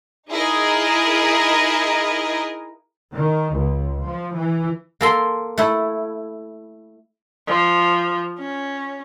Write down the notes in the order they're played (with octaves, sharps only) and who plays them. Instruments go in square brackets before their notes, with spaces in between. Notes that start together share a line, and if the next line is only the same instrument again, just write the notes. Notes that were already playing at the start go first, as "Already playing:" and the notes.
[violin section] D#4 E4 G#4 A#4 D#5
[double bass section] D#3
C#2
F3
E3
[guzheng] A#3 A4 C6
A3 E4
[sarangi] F3
C#4